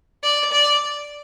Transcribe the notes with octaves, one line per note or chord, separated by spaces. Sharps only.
D5
D5